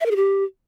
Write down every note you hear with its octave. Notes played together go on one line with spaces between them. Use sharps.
E5
A#4
G#4
G4